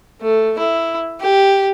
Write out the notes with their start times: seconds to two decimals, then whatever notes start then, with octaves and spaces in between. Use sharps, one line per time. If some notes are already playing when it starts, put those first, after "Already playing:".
0.21 A3
0.59 E4
1.20 G4